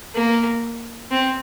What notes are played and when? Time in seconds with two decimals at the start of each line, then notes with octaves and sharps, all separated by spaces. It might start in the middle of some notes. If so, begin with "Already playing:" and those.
0.15 A#3
1.11 C4